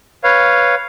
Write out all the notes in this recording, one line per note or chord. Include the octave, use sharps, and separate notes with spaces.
B4 C#5 F5